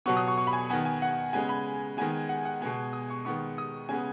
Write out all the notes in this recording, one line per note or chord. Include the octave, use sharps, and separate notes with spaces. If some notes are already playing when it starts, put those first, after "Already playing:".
B2 F#3 B3 C#6
D#6
C#6
C#6
B5
G#5
D#3 B3 G#5
G#5
F#5
C#3 G#3 B3 G#5
B5
D#3 G#3 B3 G#5
F#5
F#5
B2 G#3 B3 G#5
D#6
C#6
D#3 G#3 B3 C#6
D#6
C#3 G#3 B3 G#5